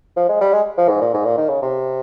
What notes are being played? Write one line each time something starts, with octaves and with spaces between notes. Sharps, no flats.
F3
G#3
G3
G#3
F3
G#2
A#2
G#2
A#2
D#3
C#3
C3